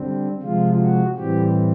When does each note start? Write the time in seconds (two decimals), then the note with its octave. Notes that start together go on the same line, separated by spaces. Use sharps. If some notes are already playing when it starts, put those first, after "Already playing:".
Already playing: D3 G3 C4
0.42 C3 F3 G#3 F4
0.80 F#4
1.16 A2 E3 G3 C4 G4